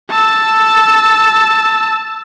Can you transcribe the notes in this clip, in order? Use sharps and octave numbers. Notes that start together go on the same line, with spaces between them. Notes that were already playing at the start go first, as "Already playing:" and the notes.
A5 E6